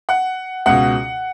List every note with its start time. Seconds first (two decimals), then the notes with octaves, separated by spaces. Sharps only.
0.09 F#5
0.66 C#2 B2 F#5